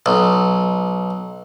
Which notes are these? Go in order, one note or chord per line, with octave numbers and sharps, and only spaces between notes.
B1